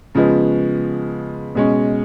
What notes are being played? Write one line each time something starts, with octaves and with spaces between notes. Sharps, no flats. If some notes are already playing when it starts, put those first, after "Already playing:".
C#3 F3 G#3 B3
B2 G#3 C#4